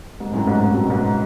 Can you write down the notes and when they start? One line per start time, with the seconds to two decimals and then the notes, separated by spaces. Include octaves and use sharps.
0.20 G#2
0.33 F#2 A2
0.47 G#2
0.60 G#2
0.73 G#2 B2
0.90 G#2